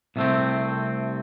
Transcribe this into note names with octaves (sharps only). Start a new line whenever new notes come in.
C2 C3 A3 C4